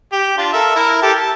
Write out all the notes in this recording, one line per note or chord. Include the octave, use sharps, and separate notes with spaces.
G4
D4 F4
A4 A#4 E5
E4 A#4
G4 A4 A5
A5